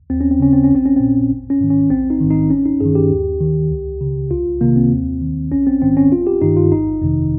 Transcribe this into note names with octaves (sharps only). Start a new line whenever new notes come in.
D#2 C4
C#4
C4
C#3 C#4
C4
C#4
A#1 C4
C#4
A#2 C4
G#1
C#4
G#2 D#3
C#4
A#1 C4
D#4
G#2 D#3
D#4
G#1 C#4
D#4
G2 D#3 G#4
G4
D#2
D#3
C#2
C#3
C2 F4
C3 D#3 A#3
C4
D#2
D#3
A#1 C#4
C4
G#2 D#3 C4
C#4
G#1 F4
G4
G2 D#3 D#4
F4
G1 D#4
F2 C3 D#3